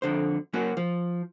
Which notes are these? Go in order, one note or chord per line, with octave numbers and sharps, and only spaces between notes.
F2 D3 C5
F#3 A#3 C#4 F#4
F3